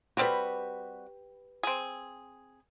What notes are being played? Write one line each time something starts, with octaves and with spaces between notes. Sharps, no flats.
G3 C4 F#4 G4 B4
C4 G#4